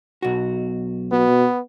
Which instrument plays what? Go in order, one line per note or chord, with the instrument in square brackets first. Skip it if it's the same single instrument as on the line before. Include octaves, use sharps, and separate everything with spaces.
[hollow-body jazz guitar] B1 F#4
[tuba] B2 [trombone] B3